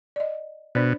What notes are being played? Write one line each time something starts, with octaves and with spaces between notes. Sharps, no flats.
D5 D#5
B2 D4 C5 D5